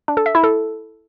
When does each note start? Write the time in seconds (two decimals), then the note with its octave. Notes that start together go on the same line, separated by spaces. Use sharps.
0.08 D4
0.17 A4
0.26 E5
0.35 E4
0.44 A4